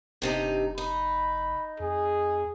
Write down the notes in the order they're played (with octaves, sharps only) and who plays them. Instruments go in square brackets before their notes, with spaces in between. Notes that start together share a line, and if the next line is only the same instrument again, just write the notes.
[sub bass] F1 [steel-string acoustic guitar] G2 C3 D#4
[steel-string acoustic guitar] D#4 [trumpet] B5
[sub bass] F2 [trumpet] G#4